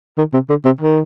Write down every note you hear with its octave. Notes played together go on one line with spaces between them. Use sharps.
D#3
C3
D3
C3
D#3